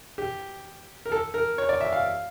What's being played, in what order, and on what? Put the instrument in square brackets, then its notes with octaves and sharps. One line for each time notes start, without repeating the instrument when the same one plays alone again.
[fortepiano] G4
A#4
A4
A#4
C#5
D5
E5
F5